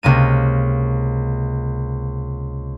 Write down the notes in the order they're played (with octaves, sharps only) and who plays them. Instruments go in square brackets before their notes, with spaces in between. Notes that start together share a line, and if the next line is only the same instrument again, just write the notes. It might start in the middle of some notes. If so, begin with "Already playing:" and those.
[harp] C#2 C3 A#3 D#7